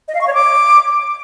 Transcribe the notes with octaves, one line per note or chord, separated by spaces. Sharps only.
D#5
F5
C#6
C#5
D6